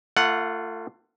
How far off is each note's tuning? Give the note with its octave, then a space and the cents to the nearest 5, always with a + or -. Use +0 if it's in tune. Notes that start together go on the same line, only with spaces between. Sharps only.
A3 +30 F4 -10 F#5 +0